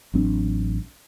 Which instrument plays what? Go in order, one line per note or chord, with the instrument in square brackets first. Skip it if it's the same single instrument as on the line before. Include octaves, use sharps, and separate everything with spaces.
[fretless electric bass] A1 F#3 C4 D4